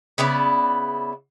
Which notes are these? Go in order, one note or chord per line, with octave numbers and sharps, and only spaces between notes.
C#3 B3 E4 D5